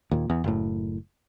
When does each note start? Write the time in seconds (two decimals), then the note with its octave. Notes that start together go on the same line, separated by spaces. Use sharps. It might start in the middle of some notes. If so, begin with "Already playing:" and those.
0.11 D#2 A#2
0.30 E2
0.44 F#1 A2